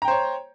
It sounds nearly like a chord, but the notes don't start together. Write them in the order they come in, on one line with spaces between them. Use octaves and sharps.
A#5 G5 C5 C#5